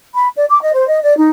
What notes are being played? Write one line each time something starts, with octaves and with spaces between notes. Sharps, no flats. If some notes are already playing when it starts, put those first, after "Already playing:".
B5
D5
D6
D#5
C5
D#5
D5
D#4